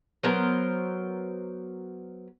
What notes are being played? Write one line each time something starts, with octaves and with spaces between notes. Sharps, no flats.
F#3 B3 A#4 C5